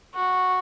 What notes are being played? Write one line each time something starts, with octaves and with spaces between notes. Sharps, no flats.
F#4